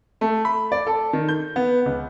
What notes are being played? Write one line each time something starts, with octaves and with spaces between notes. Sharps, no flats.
A3
B5
D5
A4
D#3
G6
B3
C#2